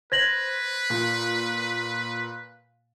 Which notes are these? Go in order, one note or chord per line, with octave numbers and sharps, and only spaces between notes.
B4 C5 G#6 A#6 F#7
A#2